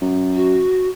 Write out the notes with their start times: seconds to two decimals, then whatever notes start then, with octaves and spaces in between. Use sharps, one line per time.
0.02 F#2
0.34 F#4